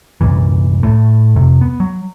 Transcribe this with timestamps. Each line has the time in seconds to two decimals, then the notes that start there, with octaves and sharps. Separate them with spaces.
0.21 C2 F#2 A#2 E3
0.83 A2 A3
1.36 F2 C3
1.61 B3
1.80 F#3